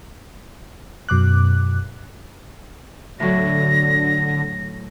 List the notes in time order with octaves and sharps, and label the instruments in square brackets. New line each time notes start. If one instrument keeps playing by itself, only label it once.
[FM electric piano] F#2 B2 D6 F#6
[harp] A2 F#3 [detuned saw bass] D3 [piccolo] A#6